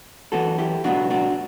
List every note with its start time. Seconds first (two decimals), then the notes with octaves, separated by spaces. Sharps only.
0.32 F#2 E3 B3 F#4 A4
0.58 E4 G4
0.84 C#2 B2 F#3 B3 D4 F#4
1.10 D4 F#4